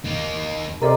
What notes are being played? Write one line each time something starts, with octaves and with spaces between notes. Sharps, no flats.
A#3 D#4
C3 A4 A#4 D5 D#5 A#5